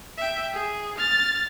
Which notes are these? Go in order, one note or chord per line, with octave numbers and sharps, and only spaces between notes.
E5 G5
G#4
F6 A6